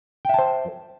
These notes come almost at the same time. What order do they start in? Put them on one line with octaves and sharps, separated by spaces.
G5 E5 A5 C5